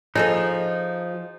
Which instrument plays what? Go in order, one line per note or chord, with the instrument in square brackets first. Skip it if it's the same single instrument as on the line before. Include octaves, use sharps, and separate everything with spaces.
[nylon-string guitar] F3 [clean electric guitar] D#4 [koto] G#4 A4 D#5